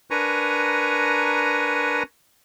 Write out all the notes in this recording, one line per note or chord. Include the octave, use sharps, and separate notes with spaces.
D4 A#4 B4 G#5 A#5 C#6